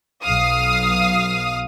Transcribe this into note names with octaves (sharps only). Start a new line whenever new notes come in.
B1 F5 D#6